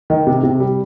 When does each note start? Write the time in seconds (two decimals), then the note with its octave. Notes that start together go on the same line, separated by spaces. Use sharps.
0.10 D#3
0.27 C3
0.43 C3
0.60 G3